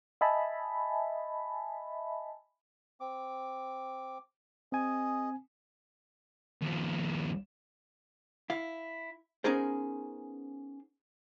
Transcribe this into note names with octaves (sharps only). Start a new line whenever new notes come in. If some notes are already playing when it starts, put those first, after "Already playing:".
D#5 E5 G#5 A5 B5
C4 D6
C4 G#4 D#5 G#5
D#2 F3
E4 F5
B3 C#4 D#4 G#4 A#4 C5